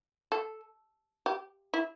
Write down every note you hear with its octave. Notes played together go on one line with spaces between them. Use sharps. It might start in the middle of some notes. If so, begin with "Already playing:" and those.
A4
G4
E4